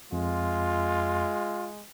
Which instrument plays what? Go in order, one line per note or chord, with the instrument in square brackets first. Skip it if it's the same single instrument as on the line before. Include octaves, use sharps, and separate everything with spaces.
[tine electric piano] F2 [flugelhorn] G#3 [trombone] F4